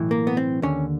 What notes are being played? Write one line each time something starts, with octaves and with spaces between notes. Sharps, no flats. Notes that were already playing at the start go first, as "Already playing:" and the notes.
Already playing: B1 A2 E3
A#3
B3
C4
D#2 D3 C#4